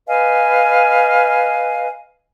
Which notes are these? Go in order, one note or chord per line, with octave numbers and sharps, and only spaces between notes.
B4 D#5 F5 G#5